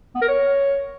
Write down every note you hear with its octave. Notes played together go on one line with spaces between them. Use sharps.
B3
A#4
C#5